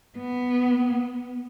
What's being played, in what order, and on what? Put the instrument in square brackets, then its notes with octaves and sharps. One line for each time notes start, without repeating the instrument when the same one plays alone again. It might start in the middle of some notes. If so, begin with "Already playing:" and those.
[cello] B3